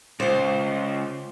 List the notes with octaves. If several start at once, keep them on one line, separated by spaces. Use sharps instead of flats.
C#2 F4 C5